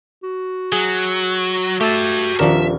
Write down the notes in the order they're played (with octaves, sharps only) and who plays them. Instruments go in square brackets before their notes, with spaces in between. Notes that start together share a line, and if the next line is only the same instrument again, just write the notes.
[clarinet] F#4
[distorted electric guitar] F#3 [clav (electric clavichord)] G#4
[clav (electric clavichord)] A3 [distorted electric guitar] G4 A5 [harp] E6 A6
[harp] D#1 F6 [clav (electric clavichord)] F3 D4 A#4 [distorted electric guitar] E5